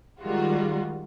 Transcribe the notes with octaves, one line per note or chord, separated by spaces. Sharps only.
D#3 G3 G#3 F4 F#4